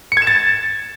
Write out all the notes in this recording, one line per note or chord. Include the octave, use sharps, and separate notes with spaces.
C#7
G#6
E7
A6